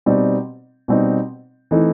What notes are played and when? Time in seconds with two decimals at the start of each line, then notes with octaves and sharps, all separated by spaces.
0.06 B2 G3 C4 D#4
0.88 B2 G3 C4 D#4
1.71 E3 A3 C4 D#4